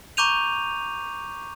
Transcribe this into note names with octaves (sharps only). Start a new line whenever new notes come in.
A#5 C#6 D6 G6 D#7 F7